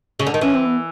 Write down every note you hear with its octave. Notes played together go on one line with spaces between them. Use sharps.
C#3
D3
D#3
E3 C#4
C4
B3